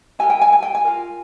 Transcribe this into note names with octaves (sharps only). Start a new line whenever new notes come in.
E4 G4 A#4 G#5
G5
G#5
G#5
G5
G#5
F4 A#4